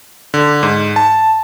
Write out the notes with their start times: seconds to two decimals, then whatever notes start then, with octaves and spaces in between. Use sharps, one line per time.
0.34 D3
0.63 G#2
0.96 A5